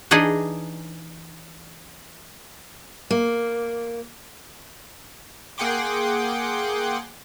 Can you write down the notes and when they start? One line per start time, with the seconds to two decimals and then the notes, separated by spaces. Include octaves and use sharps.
0.11 E3 D4 D#4 G#4 D5 D#5
3.11 A#3
5.58 A#3 G#4 F#5 G5 C6 D6